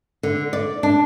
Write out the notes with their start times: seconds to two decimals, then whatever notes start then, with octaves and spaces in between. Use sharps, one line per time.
0.23 D3
0.53 D5
0.83 D4